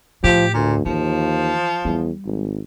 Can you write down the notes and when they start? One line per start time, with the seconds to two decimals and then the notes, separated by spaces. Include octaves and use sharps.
0.24 A2 F3 G4
0.54 D2 A#2
0.85 D#2 E3 F3
1.85 E2 G3
2.25 G#1